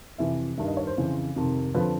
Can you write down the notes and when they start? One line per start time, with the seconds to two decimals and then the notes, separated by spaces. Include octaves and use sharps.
0.18 F2 C3 E3 E5
0.57 G2 D#3 E5
0.68 D#5
0.77 C#5
0.87 C5
0.97 F2 C#3 E3
1.36 F2 C3 D#3
1.74 F2 D3 F3 B4